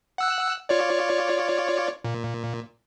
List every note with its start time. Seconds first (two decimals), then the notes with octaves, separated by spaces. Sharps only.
0.18 F#5 E6 F#6
0.69 F4 C#5 D5
2.04 A#2